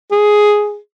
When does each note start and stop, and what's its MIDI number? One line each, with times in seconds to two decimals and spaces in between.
0.12 0.77 68